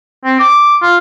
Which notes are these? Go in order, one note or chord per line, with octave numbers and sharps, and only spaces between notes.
C4
D6
F4